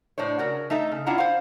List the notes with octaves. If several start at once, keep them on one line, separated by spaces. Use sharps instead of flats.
A2 D4 C5 C#5
C#3 F#4 A#4
A3 D#4 A4 E5
C#3
C#4 D4 E4 F4 F#5 A#5
C5 F5